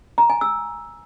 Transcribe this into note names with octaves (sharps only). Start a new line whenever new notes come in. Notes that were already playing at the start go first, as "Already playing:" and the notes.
A#5
G#5
E6